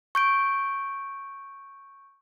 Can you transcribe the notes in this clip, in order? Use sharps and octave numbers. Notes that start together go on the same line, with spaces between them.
C#6 G6 D7